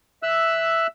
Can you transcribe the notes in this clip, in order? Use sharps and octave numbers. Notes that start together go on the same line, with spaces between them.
E5 E6 F#6